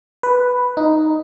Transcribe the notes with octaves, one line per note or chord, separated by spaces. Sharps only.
B4
D#4